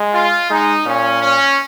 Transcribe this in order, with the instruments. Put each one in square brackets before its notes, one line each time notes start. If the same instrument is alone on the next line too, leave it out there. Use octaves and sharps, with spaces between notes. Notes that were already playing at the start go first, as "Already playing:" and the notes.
Already playing: [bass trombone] G#3
[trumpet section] F4
[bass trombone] G#3 [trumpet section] D#4
[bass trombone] A#2 [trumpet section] C#4
[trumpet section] C#4